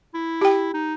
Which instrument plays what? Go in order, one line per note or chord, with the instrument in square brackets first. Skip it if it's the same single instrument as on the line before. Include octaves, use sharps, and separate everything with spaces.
[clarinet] E4
[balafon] G4 G5
[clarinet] D#4